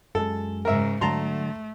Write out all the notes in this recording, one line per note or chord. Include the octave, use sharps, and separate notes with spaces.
F#2 G#3 A4
G#2 C#3 A#4 E5
D3 F#3 A3 A5 A#5 C6